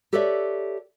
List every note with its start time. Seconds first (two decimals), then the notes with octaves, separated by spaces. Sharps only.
0.13 G4 A4 B4 C#5 D5 E5